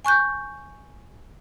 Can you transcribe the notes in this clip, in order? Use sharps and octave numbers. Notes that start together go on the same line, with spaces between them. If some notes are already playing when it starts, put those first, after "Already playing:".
G#5 C#6 F#6 G6